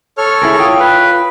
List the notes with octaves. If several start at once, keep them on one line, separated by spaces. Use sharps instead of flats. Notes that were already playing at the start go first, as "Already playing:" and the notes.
A4 C#5 F6
E4 G#4 A#4
F4 G5 D#6
B4